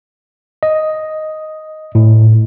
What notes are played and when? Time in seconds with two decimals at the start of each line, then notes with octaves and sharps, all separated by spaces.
0.63 D#5
1.95 A2